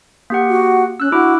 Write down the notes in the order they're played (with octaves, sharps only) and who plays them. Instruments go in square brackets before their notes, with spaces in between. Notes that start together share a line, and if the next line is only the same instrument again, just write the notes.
[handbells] A#3 G4 F#5
[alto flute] F#4
[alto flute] C#4 [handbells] E6 F#6
[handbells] D4 E4 D6 [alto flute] F#4